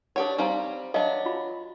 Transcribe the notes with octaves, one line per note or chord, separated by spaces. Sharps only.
D4 G4 A4 C#5 F#5
G3 C4 D#4 F5 A#5
F#3 D4 A4 D#5 F5
F4 F#4 B5